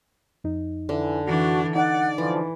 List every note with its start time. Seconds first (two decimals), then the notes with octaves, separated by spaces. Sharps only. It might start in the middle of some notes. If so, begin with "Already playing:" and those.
0.44 F2 D#4
0.89 D3 E3
1.26 E3 D4 F#4
1.76 D#4 D5 F#5
2.18 D3 E3 F3